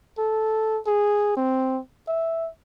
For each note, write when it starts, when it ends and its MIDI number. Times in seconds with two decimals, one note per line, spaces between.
0.18 0.79 69
0.86 1.36 68
1.37 1.80 60
2.08 2.49 76